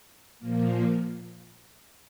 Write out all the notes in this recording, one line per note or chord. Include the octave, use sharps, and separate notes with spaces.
A#2 F3 A#3